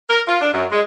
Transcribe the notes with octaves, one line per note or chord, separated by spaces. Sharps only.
A#4
F4
D4
F#2
G#3